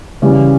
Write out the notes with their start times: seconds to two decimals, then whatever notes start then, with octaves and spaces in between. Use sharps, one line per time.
0.22 C#3 E3 G3 C#4